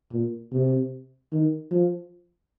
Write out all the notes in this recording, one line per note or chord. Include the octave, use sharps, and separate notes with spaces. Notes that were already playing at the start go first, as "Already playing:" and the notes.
A#2
C3
D#3
F3